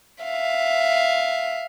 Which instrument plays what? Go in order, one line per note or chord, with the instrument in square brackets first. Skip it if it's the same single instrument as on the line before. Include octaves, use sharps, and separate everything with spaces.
[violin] E5 F5